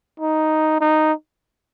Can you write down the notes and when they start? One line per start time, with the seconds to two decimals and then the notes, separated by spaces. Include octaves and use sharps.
0.20 D#4
0.81 D#4